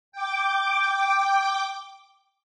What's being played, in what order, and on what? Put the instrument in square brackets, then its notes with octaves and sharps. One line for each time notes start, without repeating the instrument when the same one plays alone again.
[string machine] G5 D6